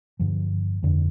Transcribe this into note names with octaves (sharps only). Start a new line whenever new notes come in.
G2 D3 F3
F2 D3 F3